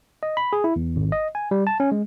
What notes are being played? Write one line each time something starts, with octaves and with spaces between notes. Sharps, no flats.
D#5
B5
G#4
E4
E2
G#1
D#5
G#5
G3
A5
C#4
G#3